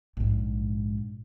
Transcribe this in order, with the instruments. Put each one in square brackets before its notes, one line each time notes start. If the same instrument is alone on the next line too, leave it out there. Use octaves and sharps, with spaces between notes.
[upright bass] A#1 G#2